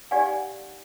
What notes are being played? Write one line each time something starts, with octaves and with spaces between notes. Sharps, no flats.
D#4 G4 D5 F5 F#5 G#5